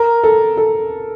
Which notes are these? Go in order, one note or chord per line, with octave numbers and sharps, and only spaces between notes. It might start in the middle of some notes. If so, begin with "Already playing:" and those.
Already playing: A#4
A4
A4